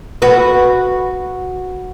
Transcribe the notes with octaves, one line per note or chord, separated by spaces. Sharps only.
F#4 B4